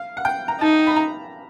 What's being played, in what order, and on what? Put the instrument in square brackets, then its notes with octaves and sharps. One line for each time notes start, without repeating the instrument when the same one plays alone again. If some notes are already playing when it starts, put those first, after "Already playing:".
Already playing: [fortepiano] F5
F#5
G5
A#5
[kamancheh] D#4 [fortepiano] A5
[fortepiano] B5
A#5